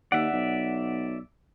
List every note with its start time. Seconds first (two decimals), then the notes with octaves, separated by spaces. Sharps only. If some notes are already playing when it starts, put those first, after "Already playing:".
0.12 D#2 D5 E5 F#5
0.33 B1